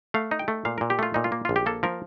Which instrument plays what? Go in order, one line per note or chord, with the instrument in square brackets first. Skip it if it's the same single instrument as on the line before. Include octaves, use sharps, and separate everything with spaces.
[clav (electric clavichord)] A3 F5
D#4
G5
A3
A#2 F5
A#2 A#4
G4
A3 F4
A#2 D#4
F4
A#3
A#1 F4
G4
A#3 A4
F3 A#4